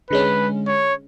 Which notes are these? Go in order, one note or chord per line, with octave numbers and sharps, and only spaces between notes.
D3 G#3 C#4 B4
C#5